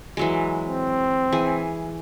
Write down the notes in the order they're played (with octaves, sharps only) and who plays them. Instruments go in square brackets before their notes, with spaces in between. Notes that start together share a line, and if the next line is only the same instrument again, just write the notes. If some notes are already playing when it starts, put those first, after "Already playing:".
[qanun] E3 F#3 G#3
[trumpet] C4
[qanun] E3 G#4